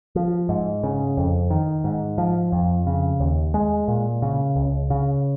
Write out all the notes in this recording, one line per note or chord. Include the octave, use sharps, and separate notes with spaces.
F3
G#2
C#3
F2
D#3
G#2
F3
F2
C#3
D#2
G#3
A#2
C#3
C#2
C#3